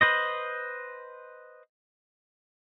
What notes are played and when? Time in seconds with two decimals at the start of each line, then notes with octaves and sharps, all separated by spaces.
0.01 B4 C5 D#5